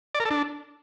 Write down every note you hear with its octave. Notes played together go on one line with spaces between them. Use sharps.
D5
A#4
A4
D4